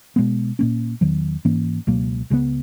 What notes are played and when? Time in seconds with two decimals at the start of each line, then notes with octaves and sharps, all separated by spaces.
0.16 B2 G#3 B3
0.59 A#2 A#3 C#4
1.01 E2 D#3 F#3
1.45 G#2 E3 A#3 C#4
1.87 C#2 B2 F#3 A#3
2.30 C#2 C#3 G#3 B3